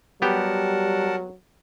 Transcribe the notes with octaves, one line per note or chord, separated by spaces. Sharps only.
F#3 G3 B3 G4 A#4 F#5 A5